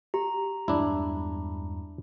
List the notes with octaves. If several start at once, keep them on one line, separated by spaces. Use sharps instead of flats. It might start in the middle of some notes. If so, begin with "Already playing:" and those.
G4 A#5
E2 G2 G#3 D4 E4 A#5 B5